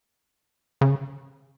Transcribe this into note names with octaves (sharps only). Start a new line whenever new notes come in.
C#3